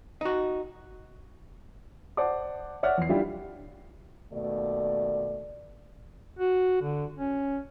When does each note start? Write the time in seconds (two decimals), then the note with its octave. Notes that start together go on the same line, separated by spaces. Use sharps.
0.21 D#4 F#4
2.17 C5 D5 F#5 A5 D6
2.83 C#5 D5 E5 F#5 F6
2.98 E2 C7
3.09 G3 D4 E4 F4 G4
4.33 D#2 B2 A3 D5
6.39 F#4
6.82 D3
7.18 C#4